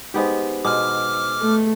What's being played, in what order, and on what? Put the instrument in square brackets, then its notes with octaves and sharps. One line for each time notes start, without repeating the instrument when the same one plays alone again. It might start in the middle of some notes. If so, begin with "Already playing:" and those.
[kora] G#3 B3 G4 [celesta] D#4 C5
[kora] B2 G#3 [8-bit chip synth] D6 F6
[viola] A3